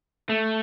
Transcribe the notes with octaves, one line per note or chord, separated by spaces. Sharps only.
A3